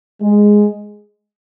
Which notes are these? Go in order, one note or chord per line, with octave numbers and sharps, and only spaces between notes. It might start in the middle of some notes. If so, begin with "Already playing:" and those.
G#3